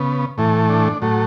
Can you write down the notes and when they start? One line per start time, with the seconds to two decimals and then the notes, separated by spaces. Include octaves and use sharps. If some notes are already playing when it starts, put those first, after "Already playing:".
Already playing: C#3 B3
0.38 A2 E3 A3
0.69 D4
1.02 A2 F#3 A3